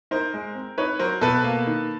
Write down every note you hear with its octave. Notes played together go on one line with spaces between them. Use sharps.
D#4 A#4 C5
G#3
C4
D#4 B4 C#5
F#3 A#4 C5
B2 A4 B4
A#3
D#3